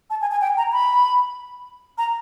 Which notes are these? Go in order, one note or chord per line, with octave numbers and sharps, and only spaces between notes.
A5
G#5
G#5
G5
A#5
B5
A#5